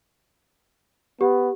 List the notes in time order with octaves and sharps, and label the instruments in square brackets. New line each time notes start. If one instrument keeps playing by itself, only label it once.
[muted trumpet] B3 [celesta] G4